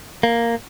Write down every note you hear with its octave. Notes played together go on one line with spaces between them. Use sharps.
A#3